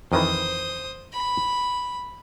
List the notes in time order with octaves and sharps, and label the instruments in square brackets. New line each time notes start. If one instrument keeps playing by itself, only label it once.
[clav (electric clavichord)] F2 D#3 E3 [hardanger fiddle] C5 D#6
[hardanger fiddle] B5